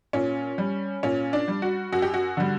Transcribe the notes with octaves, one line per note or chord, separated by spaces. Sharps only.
A#2 C#4
G3
A#2 C#4
D4
G3
F#4
F#2 F#4
G4
F#4
D3 G3